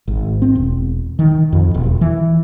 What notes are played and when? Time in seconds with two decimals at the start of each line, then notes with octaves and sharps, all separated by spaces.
0.08 G#1
0.42 C4
0.55 E1
1.19 D#3
1.53 F2
1.74 E1
2.01 E3